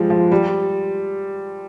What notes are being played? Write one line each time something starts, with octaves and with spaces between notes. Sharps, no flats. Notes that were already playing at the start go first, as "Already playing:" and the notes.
Already playing: F3 G3 G#3
F3
G3